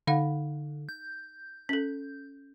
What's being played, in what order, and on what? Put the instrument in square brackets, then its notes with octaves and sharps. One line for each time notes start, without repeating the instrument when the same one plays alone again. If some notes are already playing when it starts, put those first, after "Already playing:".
[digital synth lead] D3 [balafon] D#4 F5 F#5
[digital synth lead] G6
[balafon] C#4 A4